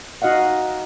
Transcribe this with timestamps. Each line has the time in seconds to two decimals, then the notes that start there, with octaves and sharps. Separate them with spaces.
0.22 D#4 F#4 D#5 F5 F#5